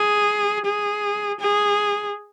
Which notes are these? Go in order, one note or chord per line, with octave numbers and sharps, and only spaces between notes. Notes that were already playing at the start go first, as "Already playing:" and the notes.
Already playing: G#4
G#4
G#4